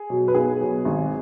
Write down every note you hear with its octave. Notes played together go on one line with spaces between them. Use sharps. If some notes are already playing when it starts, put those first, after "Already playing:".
Already playing: G#4
B2 F#3
B4
B1 G#4
B2 F#3
G#1